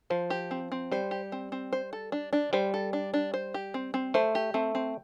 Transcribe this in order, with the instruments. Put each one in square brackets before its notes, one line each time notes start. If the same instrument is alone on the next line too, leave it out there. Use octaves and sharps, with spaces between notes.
[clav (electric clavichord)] F3 [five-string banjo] C5
[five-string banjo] G4
C4
C4
[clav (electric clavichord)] G3 [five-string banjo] C5
[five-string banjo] G4
C4
C4
C5
A4
D4
D4
[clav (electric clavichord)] G3 [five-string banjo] C5
[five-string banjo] A4
D4
D4
C5
G4
C4
C4
[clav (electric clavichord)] A3 [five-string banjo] C5
[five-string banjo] G4
[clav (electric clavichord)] A3 [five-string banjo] C4
[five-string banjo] C4